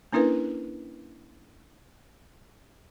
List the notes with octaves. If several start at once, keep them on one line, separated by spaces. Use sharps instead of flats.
A#3 C#4 D4 E4 A#4 B4